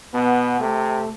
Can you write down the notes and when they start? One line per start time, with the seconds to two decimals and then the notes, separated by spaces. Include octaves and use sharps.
0.14 B2 B3
0.60 C3 A3